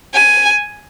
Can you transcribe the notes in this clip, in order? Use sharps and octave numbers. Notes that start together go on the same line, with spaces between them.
G#5